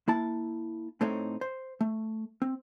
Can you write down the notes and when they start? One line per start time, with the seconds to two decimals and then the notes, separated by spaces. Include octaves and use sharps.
0.08 A#3 E4 A5
1.01 A2 A3 C4 D#4 A4 C#5
1.41 C5
1.81 A3
2.42 C4